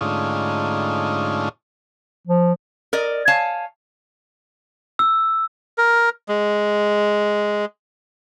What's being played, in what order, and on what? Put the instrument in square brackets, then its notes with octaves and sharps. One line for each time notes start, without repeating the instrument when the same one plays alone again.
[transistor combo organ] G#2 D3 A3 C#4 D#4 F4
[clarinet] F3
[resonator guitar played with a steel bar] A#4 D5 D#5
C#5 F5 G#5 A5
[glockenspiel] E6
[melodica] A#4
G#3